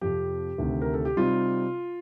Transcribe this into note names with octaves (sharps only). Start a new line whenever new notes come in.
F2 C3 F3 G4
D2 C3 D#3
A#4
A4
G4
C3 G3 C4 D#4 F4